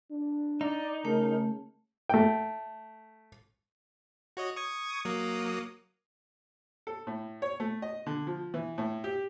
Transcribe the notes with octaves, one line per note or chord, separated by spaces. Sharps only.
D4
D#4 D5
C#3 A3 A#4
A3 G5
F#4 C#5 D#5
C#6 D#6 G#6
F#3 A#3 D#6
A4
A2
C#5
A3
D#5
D3
F3
E3
A2
G4